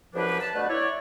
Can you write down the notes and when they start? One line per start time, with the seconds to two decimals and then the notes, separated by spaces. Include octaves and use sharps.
0.14 C2 F#2 F3 A#3 D4 B4
0.40 A5
0.54 B2 D3 A3 B4
0.69 E4 C#5 D5